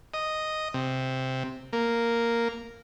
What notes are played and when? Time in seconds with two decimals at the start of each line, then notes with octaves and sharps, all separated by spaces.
0.14 D#5
0.74 C3
1.73 A#3